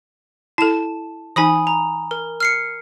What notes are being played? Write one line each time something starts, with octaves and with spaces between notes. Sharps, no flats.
E4 A4 A5 E7
E3 D#4 G#5 B5 D#6
A#5
A#4
F6 C7 C#7